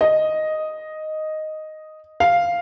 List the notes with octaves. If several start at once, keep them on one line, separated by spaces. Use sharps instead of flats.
D#5
F5